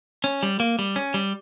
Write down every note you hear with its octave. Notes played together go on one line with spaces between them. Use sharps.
C#4
G3
A#3
G3
C#4
G3